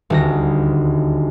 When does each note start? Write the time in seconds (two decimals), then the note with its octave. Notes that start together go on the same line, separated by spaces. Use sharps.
0.10 D#1 D2 A#6